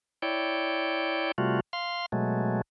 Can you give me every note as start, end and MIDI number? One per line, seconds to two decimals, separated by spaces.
0.22 1.32 64
0.22 1.32 73
0.22 1.32 74
0.22 1.32 79
1.38 1.60 48
1.38 1.60 55
1.38 1.60 57
1.38 1.60 65
1.38 1.60 66
1.73 2.06 77
1.73 2.06 84
2.12 2.61 47
2.12 2.61 54
2.12 2.61 56
2.12 2.61 57